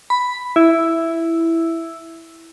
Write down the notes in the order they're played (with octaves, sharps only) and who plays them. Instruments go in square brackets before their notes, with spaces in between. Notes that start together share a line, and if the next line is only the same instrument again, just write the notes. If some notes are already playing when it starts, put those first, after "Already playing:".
[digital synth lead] B5
E4